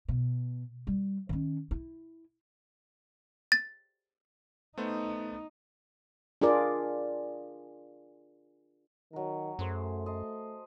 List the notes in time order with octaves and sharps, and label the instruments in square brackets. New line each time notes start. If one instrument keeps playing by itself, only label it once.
[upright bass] B2
G3
D#3 C#4
E4
[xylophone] A6
[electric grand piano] A3 B3 C5 [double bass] D#4
[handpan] D4 F4 G#4 A#4 D5
[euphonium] D#3 [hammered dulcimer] F#3 A#4
[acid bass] F#2 [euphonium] A3 [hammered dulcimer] G#4 C5
[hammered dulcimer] D#5 A5 C6